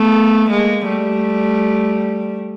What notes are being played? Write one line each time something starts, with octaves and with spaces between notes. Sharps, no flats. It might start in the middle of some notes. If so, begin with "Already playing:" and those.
Already playing: A3 B3
G#3 A#3
G3 A3